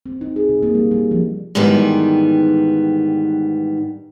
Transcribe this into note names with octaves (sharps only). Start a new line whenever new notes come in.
C4
D#4
G#4
C3
A#3
G3
G3
F3
G#2 D#3 E3 G3 B3